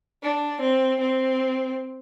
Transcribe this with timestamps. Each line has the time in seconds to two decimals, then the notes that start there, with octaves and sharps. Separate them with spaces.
0.23 D4
0.61 C4
1.00 C4